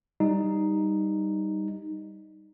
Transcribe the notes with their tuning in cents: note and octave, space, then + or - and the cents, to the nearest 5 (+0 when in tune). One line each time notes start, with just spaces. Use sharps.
G3 +0 D#4 +0